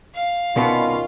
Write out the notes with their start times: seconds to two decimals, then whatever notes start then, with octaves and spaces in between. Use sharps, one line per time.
0.15 F5
0.56 C2 B2 D#3 B3 C#4 F4